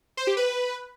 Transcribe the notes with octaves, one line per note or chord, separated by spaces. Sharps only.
C5
G4
B4